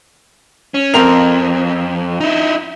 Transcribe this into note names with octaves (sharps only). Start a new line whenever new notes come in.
C#4
F2 C4 A#4 F7
D#4 E4